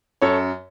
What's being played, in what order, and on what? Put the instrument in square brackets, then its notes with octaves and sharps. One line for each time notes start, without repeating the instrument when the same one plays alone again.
[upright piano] F#2 A4 C#5